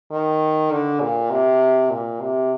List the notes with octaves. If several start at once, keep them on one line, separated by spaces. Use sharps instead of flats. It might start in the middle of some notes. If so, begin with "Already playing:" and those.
D#3
D3
A#2
C3
A#2
C3